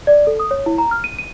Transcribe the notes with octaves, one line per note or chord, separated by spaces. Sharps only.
D5
A4
D#6
C#5
E4
A#5
F6
D#7
D#7